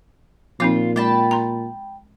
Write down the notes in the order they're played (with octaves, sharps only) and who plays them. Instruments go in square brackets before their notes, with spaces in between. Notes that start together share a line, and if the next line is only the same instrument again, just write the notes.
[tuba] A#2 [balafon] F3 C4 D#4 [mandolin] F4
[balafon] G#3 [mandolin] G5 A5 B5
[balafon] A#5 C6